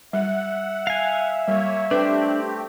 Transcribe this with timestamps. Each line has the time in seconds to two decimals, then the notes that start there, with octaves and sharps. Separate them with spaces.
0.13 G3 E5 F#5
0.87 F5 G#5
1.48 G3 A#3 C#5
1.91 A3 C4 D4 G4 B4